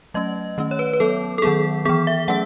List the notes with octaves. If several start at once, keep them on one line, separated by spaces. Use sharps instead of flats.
F#3 A3 C#4 D#5
D#3 A3 C#4
C#5
B4
B4
F#3 B3 A4
A4
D#3 F#3 B3 G#4
E3 B3 G#4
E5
F#3 A3 C#4 F#5